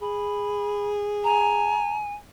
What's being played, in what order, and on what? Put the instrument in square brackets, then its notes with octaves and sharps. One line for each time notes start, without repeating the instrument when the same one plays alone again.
[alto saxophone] G#4 [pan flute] B5
[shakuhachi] G#5 [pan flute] A#5